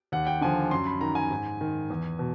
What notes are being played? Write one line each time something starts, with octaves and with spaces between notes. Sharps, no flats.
D#2 F#5
G5
D3 F3 G#5
F#2 C6
B5
D#3 A#5
G#5
G#2
D#3
E2
B2